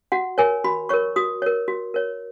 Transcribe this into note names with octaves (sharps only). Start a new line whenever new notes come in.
F#4 F#5
A#4 C#5 G#5
F#4 B5
A#4 C#5 C#6
F#4 D#6
A#4 C#5
F#4
A#4 C#5